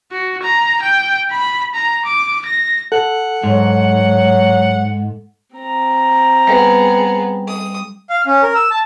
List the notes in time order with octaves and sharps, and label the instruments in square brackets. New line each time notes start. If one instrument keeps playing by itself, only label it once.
[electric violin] F#4
A#5
G5
B5
A#5
D6
A#6
[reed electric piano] A4 [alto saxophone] F#5
[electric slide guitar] G#2 [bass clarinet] F#3
[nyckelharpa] C4 A#5
[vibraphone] G3 [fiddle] B3 G#4
[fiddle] D#6
[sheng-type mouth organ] F5
C#4
A#4
E6
A5